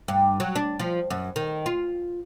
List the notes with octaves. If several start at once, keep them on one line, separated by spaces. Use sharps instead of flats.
G2
F#3
D4
F3
F#2
D#3
F4